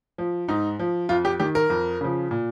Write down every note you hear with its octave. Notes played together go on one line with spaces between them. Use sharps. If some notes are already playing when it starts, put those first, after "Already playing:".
F3
G#2 D#4
F3
F2 F4
G4
D#3 G4
A#4
F2
C#3 F3
A#2